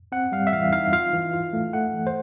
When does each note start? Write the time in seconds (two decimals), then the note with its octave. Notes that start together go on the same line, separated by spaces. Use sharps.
0.12 C4 F#5
0.32 G3 F5
0.47 E5
0.53 E3 F5
0.72 D#4 F5
0.92 F4 F5
1.14 E3
1.34 F4
1.53 A3
1.73 A3 F#5
1.94 E3
2.07 C5